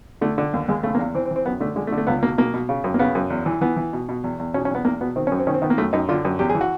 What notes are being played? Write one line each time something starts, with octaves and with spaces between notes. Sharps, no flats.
D3 A3
D3
D#2
D#2 G#3
C#3 A3
A#3
E2
E3 C4
C4
E3
C4
F#2 B3
D3 A3
D3 G#3
A3
D3
A3
C#2 B3
B2 A#3
B2 A#3
B2
C#3
F#2
A#3
C#3 B3
F#2
E2
E3
E3 B3
E3
B2
B2
E2
E2
B2 C#4
C#4
E2 B3
E2 A#3
B2 B3
D#3 C4
F#2 C#4
C4
D#3 C#4
C4
D#3 B3
A#3
F#2 A3
F#2 D#4
D3 F4
F#2
E2 G4
G#4
E3
F#4